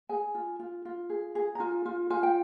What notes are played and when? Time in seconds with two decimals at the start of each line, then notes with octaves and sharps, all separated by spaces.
0.09 G#4 G#5
0.35 F4
0.59 F4
0.85 F4
1.09 G#4
1.35 G#4
1.55 A#5
1.60 F4 G#5
1.86 F4
2.10 F4 G#5
2.23 G5